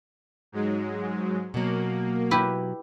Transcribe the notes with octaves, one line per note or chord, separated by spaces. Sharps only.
G#2 F#3 G#3
B2 F#3 A#3
E4 G4 B4